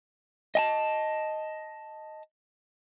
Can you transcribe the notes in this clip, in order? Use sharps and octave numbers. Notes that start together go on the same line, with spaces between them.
D#5 G#5 A5